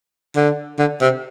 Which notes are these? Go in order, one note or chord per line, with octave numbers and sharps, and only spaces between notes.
D3
D3
C3